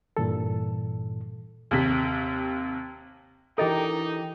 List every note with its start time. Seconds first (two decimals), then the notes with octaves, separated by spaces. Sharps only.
0.17 G2 A#2 E3 A4
1.71 D#2 C3 B6
3.58 E3 D4 D#4 G4 A4 A#4 D#5